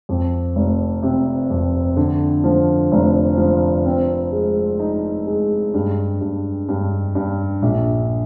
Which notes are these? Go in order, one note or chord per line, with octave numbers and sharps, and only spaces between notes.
F2
F1
C3
F2
D3
F3
F1
F3
C4
G#3
D#4
G#3
G2
G2
G2
G2
A#1